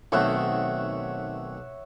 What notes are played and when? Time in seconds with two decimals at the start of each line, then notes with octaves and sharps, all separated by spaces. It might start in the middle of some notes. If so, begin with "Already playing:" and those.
0.12 B1 D#3 A3 C4 C#5 E5 F#5